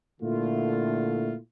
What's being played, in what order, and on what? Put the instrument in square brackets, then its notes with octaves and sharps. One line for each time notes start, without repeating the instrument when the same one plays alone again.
[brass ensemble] A#2 D3 A3 E4 F4